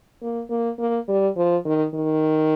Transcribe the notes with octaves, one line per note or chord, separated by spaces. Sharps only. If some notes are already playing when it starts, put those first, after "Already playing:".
A#3
A#3
A#3
G3
F3
D#3
D#3